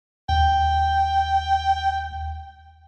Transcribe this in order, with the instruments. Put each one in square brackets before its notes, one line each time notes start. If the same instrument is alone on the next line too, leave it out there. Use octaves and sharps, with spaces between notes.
[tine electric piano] D#2 [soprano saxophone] G5